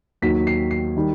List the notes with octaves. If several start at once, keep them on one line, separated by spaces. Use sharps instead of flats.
D#2 D#3 F#3 B6
C7
C7
D#3 G3